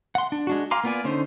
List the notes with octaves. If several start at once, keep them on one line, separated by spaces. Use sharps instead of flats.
F#5 C6
D4
G#3 D4 F#4
F5 G#5 A#5 C6 D6
A#3 B3 F4 D5 G#5
D3 C#4 D#4 C5